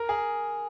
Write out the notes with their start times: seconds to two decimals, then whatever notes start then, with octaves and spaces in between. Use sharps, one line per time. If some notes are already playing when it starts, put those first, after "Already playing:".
Already playing: A#4
0.09 G#4